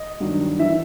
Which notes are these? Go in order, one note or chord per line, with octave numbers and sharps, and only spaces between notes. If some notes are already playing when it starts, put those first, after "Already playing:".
Already playing: D#5
G2 D#3 F#3
E3 E5